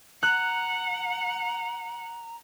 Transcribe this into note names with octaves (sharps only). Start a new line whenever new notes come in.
F#5 A#5 F#6